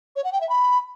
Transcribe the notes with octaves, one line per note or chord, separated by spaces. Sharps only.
C#5
F#5
G5
E5
B5